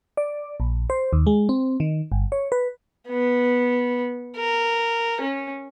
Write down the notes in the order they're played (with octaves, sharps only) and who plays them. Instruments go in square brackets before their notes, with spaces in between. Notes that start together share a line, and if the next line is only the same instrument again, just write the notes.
[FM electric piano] D5
A#1
C5
D#2
G#3
C4
D#3
G1
C#5
B4
[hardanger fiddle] B3
A#4
C#4